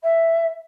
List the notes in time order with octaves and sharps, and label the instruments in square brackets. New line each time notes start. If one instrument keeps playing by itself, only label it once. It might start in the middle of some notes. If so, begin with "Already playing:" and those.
[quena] E5